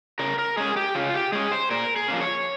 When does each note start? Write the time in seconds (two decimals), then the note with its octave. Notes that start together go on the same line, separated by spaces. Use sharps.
0.19 C#3 A#4
0.38 A#4
0.57 G#3 C#4 G#4
0.76 G4
0.95 C#3 F4
1.14 G4
1.32 G#3 C#4 G#4
1.52 C5
1.70 A#2 A#4
1.96 G#4
2.08 F3 A#3 C#4
2.21 C#5